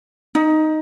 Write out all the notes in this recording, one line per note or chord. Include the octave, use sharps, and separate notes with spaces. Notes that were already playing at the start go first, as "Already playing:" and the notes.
D#4